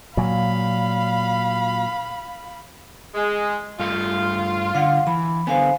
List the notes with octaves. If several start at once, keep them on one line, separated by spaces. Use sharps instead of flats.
A#2 F#3 F5 B5
G#3
G2 A3 F4 F5
D3 F5 F#5
E3 B5
D3 B3 C5 F5 G#5